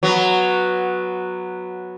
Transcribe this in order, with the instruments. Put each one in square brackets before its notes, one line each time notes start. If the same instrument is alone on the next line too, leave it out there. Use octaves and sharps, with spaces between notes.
[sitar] F#3 B3